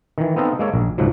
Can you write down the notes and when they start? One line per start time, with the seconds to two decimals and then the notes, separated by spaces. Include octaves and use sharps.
0.18 D#3 E3
0.36 B3 C4 D#4 A4 D#5 F5
0.59 G#3 A#3 A4 C#5
0.74 A#1
0.98 C#2 G#2 F3 F#3